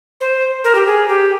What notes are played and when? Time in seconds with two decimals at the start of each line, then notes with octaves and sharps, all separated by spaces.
0.20 C5
0.64 A#4
0.75 G4
0.86 G#4
1.08 G4